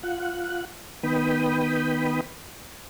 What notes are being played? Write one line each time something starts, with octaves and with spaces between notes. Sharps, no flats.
F4 F#5
D#3 B3 G5 B5 D#6